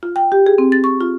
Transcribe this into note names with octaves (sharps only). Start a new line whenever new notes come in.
F4
G5
G4
G#4
C4
A6
C#6
F4